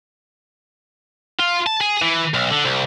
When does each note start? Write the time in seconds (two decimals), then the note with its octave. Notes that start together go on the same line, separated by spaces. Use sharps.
1.39 F4
1.66 A5
1.81 G#4
2.02 E3
2.34 B1
2.50 D3
2.65 C2